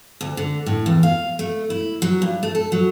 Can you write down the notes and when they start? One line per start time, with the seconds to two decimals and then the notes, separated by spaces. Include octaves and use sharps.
0.21 D2
0.37 D3
0.66 A2
0.86 E2
1.03 F5
1.39 A3
1.70 E4
2.02 F#3
2.22 G2
2.43 A3
2.55 A4
2.72 F#3